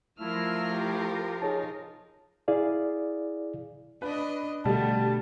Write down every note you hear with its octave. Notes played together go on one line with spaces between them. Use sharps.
F3 A3 E4 F4 A#4 E6 F6
G4
D#4 G#4 C#5 A5
E4 G#4 D5 F5
D4 B4 D#5
B2 D3 G3 A3 A5